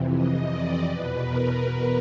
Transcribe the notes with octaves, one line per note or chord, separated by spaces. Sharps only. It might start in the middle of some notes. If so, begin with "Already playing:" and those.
Already playing: F2 C3 E3
D#5
D5
E2 B2 B4
A#4